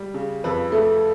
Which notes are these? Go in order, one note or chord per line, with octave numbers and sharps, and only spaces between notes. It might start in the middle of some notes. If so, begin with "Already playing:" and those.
Already playing: G3
C#3
F2 B4
A3